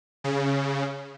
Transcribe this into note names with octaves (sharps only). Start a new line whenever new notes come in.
C#3